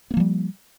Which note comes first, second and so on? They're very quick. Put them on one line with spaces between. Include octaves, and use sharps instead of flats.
B3 A#3 F3 G3